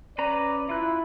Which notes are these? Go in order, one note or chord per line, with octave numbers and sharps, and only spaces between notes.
C#4 B4 D5 A#5
E4 F4 F#6